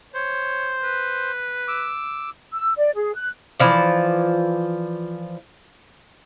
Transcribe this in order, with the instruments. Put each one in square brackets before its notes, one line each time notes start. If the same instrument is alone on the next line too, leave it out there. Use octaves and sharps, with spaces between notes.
[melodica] C5 [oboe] C#5
[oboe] B4
[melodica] D6 E6
[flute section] E6
D5
G#4
F#6
[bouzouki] E3 F3 D5